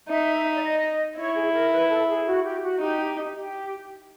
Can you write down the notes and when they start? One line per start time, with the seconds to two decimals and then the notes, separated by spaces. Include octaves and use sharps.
0.08 D#4 E5
0.55 D5
0.63 D#5
1.17 E4 C#5
1.35 G#4
1.53 A#4
1.72 B4
1.90 A4
2.08 G#4
2.26 F#4
2.44 G4
2.62 F#4
2.80 D#4 G4
3.35 G4